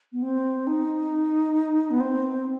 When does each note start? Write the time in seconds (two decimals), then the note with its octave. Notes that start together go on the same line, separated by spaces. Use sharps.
0.13 B3
0.22 C4
0.67 D#4
1.91 B3
2.00 C4